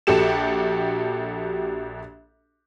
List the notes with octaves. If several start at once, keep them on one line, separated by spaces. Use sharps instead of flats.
A#1 F#4 G4 A4 E7